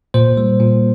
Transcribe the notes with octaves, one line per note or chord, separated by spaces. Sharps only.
A#2 C5
G3
A#2